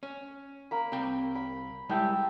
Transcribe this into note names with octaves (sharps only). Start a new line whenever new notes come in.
C#4
A#3 B5
C2 C4 G5
B5
G3 G#3 E4 E5 G5 A5